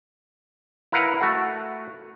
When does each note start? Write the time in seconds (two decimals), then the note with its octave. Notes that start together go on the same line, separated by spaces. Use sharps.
0.92 E4 A#4 B4 F5 F#5
1.21 A3 F#4 A4 F#5